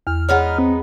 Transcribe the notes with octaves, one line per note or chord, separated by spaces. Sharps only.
E2 F6
G#3 B3 D#4 C#5 F#5 F6
C4